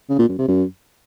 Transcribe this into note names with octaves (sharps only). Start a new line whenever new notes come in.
C#3
A#2
F#2
C3
F#2